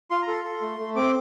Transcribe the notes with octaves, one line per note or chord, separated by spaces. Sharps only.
F4 C6
A#5
A4 C6
A4
A3
A3
C4 D6